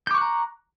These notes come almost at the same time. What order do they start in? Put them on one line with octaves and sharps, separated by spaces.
G6 D6 C#6 F#6 A#5